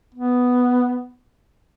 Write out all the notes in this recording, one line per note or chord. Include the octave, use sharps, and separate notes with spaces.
B3